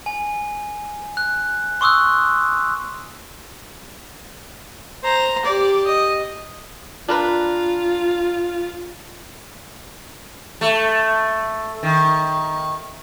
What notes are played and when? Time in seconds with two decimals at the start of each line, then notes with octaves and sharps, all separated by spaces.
0.06 G#5
1.17 F#6
1.81 C6 C#6 D#6 E6 F#6
5.03 C5 A#5
5.45 G4 D5
5.87 D#5
7.09 D4 F4 A#4 B4
10.61 A3
11.83 D#3